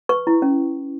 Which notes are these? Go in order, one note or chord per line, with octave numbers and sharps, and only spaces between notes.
B4 C#6
E4
C#4